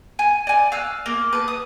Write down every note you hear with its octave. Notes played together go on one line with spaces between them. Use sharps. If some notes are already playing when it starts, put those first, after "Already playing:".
G#5
D5 G#5
F5 E6 F#6
A#3 A#4
B4 A5
D#6